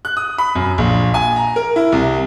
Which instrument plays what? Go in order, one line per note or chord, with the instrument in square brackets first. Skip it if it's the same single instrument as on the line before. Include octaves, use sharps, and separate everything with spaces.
[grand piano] F#6
D#6
B5
F#2
A#1
G#5
A#5
A#4
E4
C2